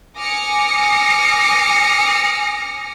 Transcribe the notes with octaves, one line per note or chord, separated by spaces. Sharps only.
G#5 D6 D#6 F6 A#6 C#7